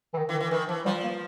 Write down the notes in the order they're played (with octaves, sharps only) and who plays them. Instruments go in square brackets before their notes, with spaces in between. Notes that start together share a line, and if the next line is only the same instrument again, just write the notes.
[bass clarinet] E3
D#3
[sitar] E3
[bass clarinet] D#3
[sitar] E3
[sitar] D#3 [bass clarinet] E3
[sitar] E3 [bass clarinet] F3
[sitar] F3 [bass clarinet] G3
[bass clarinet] A#3